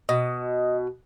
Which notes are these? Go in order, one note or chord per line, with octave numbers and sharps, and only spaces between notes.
B2 D#5